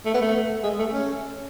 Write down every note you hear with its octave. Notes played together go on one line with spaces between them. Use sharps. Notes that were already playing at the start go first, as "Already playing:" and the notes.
A3
B3
A3
G#3
A3
C#4